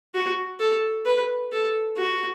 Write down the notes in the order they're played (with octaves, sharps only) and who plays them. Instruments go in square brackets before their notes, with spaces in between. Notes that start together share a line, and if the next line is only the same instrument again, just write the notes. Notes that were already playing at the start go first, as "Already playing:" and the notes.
[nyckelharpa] F#4
A4
B4
A4
F#4